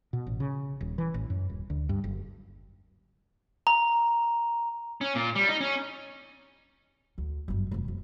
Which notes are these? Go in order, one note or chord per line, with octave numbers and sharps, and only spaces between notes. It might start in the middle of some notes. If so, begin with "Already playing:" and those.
B2
A1
C#3
D#1
E3
A1
F#2
D#1
D2
G2
F#1
A#5
C#4
A#2
G3
D#4
C#4
D2
G1 F#2
F1 C2
F#1